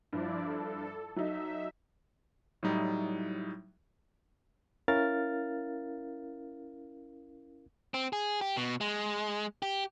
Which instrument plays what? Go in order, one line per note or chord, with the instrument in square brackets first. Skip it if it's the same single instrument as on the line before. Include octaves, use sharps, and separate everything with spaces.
[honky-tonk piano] G2 [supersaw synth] F3 E4 D5
[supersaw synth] A4
[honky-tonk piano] F#3 D#4 [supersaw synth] E5
[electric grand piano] A2 F#3 G3 D#4 E4
[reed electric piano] C#4 E4 A#4 F5 F6 A6
[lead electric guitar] C4
G#4
G4
B2
G#3
G4